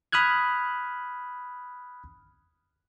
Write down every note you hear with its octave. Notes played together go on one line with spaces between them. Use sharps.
B5 D#6 F6 F#6 G#6